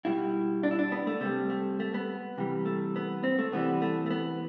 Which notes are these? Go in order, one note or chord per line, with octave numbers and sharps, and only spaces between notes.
B2 G3 E4
D4
E4
D4
B3
A3
C3 G3 A3
A3
A3
B3
C3 E3 G3
A3
B3
C4
A3
C3 E3 G3 B3
A3
A3
B3